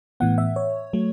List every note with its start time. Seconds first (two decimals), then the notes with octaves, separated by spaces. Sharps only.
0.20 A2 E3 B3 F#5
0.38 E5
0.56 C#5
0.93 F#3 A3